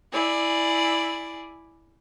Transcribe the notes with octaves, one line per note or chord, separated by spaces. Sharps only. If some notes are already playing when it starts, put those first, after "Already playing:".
E4 G#4 D5